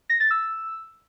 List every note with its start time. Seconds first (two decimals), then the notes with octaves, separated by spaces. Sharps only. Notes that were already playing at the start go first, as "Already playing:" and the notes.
0.10 A#6
0.20 A6
0.31 E6